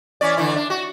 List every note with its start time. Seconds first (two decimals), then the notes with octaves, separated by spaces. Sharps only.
0.21 E3 C#4 D5
0.37 D3 E3 E4
0.56 D4
0.70 F#4